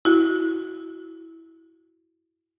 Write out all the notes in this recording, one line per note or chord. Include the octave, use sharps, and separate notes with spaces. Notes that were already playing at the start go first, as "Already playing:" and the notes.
E4 F#4